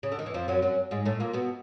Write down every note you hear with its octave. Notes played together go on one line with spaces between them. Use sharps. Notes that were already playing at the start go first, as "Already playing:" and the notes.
C#3
D3
D#3
E3
F2 F3
F#2 F#3
F#2 F#3
G#2 G#3
A2 A3
A#2 A#3
B2 B3